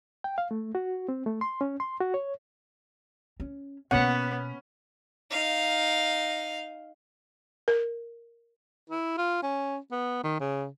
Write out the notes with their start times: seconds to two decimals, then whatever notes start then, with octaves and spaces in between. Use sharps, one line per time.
0.24 G5
0.38 F5
0.51 A3
0.75 F#4
1.09 C4
1.26 A3
1.41 C6
1.61 C#4
1.80 C6
2.00 F#4
2.14 C#5
3.40 C#4
3.91 B2 A#3 B3 C#4 F#5
5.31 D#4 F5
7.68 A#4
8.90 E4
9.18 F4
9.43 C#4
9.91 B3
10.23 D#3
10.40 C#3